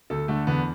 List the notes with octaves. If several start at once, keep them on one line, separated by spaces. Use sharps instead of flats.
D2 A4
D3 A3
E2 B3